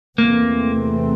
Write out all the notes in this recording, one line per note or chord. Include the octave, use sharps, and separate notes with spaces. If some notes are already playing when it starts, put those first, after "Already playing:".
E2 C3 E3 A3 A#3 C4